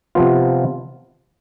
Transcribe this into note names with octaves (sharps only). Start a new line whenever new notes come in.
C3 F3 B3 F4